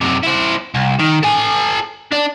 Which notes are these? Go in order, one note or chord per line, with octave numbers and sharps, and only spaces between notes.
F#2 C3
E4 C5
C2
D#3
A4 G#5
D4 D5